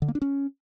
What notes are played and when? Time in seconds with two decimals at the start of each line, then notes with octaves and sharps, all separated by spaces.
0.02 D3
0.08 A#3
0.15 D4
0.22 C#4